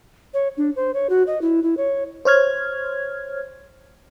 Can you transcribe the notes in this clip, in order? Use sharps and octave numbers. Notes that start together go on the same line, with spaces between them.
C#5
D4
C5
C#5
F#4
D#5
E4
E4
C#5
C5 C#5 F6 G#6